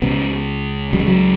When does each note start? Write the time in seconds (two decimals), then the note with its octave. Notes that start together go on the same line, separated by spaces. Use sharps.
0.02 C#2 C#3 B3
0.93 C#2 C#3 F#3
0.99 G#3
1.07 F#3